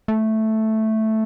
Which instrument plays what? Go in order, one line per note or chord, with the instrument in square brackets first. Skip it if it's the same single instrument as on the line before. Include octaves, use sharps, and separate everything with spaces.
[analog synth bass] A3